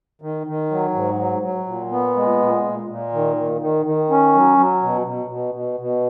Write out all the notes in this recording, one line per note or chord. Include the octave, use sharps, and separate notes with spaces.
D#3
D#3
F#3
G#2
F#3
F#3
A#2
B3
G#3
A#2
A#2
A#2
D#3
D#3
D#3
D#3
C#4
F#3
F#3
B2
B2
B2
B2
B2